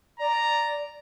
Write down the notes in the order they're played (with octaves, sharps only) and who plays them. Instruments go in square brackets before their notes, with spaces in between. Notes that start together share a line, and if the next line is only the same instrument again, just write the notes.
[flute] D5 [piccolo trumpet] A#5